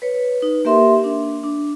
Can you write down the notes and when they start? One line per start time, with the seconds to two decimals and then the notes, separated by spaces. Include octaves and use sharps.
0.02 B4 C#5
0.41 D#4 B4
0.65 A#3 G4 A#4 E5 C6
1.04 D4
1.43 D4